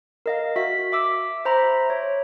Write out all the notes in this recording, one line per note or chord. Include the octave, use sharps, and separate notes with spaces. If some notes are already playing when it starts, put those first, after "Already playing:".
A#4 D#5 F5
F#4 E5 B6
E5 D6 E6
C5 E5 A#5 B5
C#5